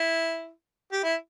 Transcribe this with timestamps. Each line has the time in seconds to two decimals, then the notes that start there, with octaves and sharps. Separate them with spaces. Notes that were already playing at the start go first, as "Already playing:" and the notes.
Already playing: E4
0.92 G4
1.04 E4